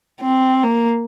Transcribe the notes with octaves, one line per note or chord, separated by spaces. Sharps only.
C4
A#3